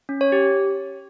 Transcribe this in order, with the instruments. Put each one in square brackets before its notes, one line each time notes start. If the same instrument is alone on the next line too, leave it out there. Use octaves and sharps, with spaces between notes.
[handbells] C#4
C#5
G4